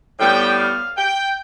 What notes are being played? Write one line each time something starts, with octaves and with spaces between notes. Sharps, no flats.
A2 G3 B3 G5
F5
G5